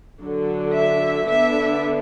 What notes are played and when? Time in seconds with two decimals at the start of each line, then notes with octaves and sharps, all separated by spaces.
0.22 D3 F#3 D4
0.75 E5
1.28 D3 B3 D4 E5